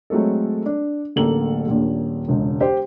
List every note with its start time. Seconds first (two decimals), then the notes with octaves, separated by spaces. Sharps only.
0.10 F#3 G#3 A3 C4 A4
0.66 D4
1.16 D1 A1 A#3 A4 F#7
1.66 D#1 A#1 A#2
2.28 E1 C#2
2.61 G4 C5